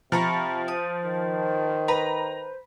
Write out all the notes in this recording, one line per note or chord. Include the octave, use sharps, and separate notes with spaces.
C3 F3 A#5 B5 C#6
C5 D#6
D#3
B4 A#5